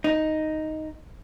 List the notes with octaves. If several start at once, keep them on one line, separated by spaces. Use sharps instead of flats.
D#4